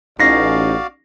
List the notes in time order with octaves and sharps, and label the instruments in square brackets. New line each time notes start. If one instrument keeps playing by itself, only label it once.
[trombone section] A1 [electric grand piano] C#4 D#4 [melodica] F#4 D5 F5 [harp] A#6 C7